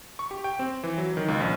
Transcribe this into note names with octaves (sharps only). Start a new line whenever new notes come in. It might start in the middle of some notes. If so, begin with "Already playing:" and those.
C#6
G4
G5
C4
E3
F#3
D#3
C#2
A#1